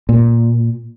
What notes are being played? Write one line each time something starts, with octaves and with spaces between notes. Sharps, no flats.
A#2